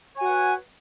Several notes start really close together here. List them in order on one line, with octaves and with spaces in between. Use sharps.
C#5 G#5 F#4 F#5 B4